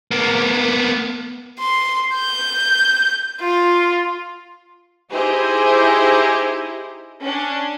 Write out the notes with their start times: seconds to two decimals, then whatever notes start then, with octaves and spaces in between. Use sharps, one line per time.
0.11 A#3 B3
1.60 C6
2.15 G6
3.41 F4
5.12 D#4 E4 G4 G#4 C5 D#5
7.24 C#4 D4